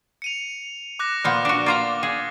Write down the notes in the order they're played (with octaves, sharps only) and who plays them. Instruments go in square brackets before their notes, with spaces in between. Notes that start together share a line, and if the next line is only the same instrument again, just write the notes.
[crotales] C#7 D#7 F7
D6 F#6 A#6
[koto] A#2 F3 B3 [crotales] F6
[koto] D4 F#4
[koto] A#3 F4 A#5 [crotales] A6
[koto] G#4